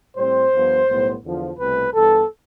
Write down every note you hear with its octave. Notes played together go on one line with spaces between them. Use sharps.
A2 G3 C4 C5
G2 F3 B3
B1 A2 G3 B3
E2 D3 F3
C2 B2 A3 C4 B4
G2 E3 B3 A4